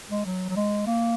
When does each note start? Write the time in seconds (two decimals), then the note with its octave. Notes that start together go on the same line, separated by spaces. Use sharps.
0.09 G#3
0.25 F#3
0.49 F#3
0.56 G#3
0.86 A#3